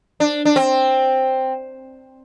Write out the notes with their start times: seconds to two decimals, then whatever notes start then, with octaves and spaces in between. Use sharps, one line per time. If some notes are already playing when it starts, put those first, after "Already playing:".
0.20 D4
0.45 D4
0.56 C4